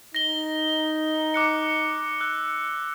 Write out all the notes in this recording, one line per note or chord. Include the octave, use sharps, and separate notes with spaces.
D#4 A#6 G7
D6 F#6 C#7
E6 F#6